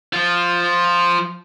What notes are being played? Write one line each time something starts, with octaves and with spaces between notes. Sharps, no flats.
F3 F4